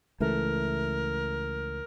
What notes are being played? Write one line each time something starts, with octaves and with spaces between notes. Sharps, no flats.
C#2 E3 A3 A#4